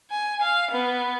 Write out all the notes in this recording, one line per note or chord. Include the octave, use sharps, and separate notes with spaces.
G#5
F5
B3